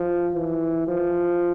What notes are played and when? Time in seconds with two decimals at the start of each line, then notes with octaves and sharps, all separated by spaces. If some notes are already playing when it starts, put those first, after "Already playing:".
Already playing: F3
0.34 E3
0.88 F3